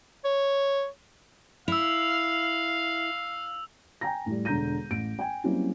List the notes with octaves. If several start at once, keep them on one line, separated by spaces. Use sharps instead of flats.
C#5
E4 F5 E6 F7
G5 G#5 A#5 A#6
A2 G3
E1 D3 A#5 G6 A#6 D#7
A1 D7
G5 G#5
F#3 G3 A#3 C4 C#4 E4